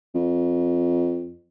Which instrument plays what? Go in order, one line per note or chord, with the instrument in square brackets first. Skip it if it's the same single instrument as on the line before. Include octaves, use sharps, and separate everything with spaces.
[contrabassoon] F2